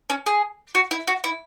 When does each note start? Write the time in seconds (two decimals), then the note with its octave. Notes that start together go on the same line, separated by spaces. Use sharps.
0.10 C#4
0.26 G#4
0.75 F#4
0.91 E4
1.07 F#4
1.24 E4